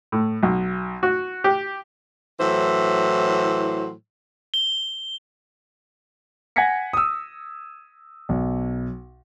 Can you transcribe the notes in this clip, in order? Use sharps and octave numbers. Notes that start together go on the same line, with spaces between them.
A2
B1
F#4
G4
A2 E3 F#3 C5
G7
F#5 G#5 G#6 A#6 B6 C#7
D#6 E6
B1